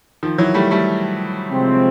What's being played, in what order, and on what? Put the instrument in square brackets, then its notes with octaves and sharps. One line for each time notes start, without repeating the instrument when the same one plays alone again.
[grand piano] D#3 F3
E3 F#3
G3 A3
G3 A3
[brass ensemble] C3 F3 G#3 C4